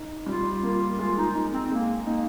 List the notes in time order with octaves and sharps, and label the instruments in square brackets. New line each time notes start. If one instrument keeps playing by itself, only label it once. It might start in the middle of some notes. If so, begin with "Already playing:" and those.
Already playing: [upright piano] D#4
[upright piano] G3 [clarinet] F4
[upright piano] A#3 [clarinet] F4
[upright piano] G#3 [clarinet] F4
[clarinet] D#4
[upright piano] D#4
[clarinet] C4
[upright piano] G#3 [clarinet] A#3
[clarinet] A#3 [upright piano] D#4